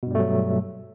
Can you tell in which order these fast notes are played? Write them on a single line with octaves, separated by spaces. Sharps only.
B2 G2 G3 A3 F#3